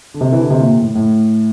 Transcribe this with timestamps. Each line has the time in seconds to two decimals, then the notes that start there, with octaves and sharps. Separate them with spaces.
0.14 D3
0.21 C3
0.32 E3
0.41 D3
0.51 C3
0.61 A#2
0.81 A2
0.95 A2